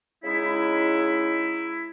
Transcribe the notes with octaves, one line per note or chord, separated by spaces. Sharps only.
C#3 G#3 D#4 E4